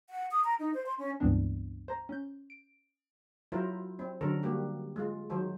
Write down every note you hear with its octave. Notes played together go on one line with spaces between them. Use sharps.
F#5
D#6
A#5
D#4
C5
C6
C#4
C#2 G2 E3 B3 C4 D4
C5 A#5
C#4 G6
D7
F#3 E4 F4 A#4 C5
C4
D3 F#3 C#4 A4 A#4
G3 A#3 F#4 G4
G#3 F4
D#3 F#3 C5